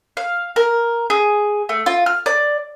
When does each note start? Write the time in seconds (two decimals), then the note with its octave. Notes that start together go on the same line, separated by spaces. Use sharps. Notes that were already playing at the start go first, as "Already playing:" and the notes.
0.17 F5
0.56 A#4
1.10 G#4
1.69 A3
1.86 F4
2.06 F6
2.26 D5